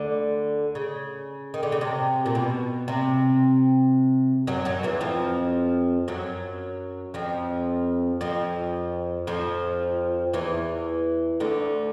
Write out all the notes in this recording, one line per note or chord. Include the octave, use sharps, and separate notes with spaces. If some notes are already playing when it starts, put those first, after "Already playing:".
Already playing: D2 D3
C#3
D#3
D3
C#3
C3
A#2
B2
C3
F#2 F#3
F#2 F#3
E2 E3
F2 F3
F#2 F#3
F2 F3
F2 F3
F2 F3
E2 E3
D2 D3